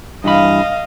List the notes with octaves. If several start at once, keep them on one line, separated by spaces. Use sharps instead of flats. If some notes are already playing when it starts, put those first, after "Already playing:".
G2 E3 D#5 F5 B5